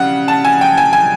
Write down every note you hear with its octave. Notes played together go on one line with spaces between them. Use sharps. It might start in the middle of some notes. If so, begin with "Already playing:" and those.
Already playing: C#3 G3 F#5
A5
G#5
G5
G#5
G#5